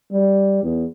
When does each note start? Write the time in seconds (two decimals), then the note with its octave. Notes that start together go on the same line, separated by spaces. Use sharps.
0.12 G3
0.63 E2